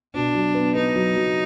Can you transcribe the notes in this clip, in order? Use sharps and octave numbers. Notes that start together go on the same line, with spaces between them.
B2 D4
F#3
B3
B3 D#4
F#3
F#3